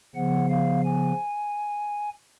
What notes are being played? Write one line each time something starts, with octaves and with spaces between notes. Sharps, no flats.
C#3 F3 B3 F#5
F5
G#5